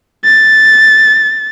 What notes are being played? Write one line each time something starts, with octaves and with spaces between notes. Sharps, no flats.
A6